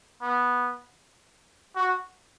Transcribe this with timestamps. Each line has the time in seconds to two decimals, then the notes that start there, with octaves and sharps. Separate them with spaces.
0.22 B3
1.76 F#4